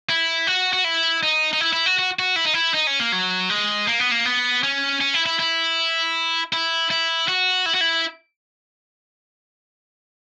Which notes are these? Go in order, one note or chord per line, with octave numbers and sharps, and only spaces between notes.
E4
F#4
F#4
E4
D#4
D#4
E4
E4
F#4
F#4
F#4
E4
D#4
E4
D#4
C#4
A#3
F#3
G#3
A#3
B3
A#3
B3
C#4
C#4
E4
E4
E4
E4
E4
F#4
E4
F#4
E4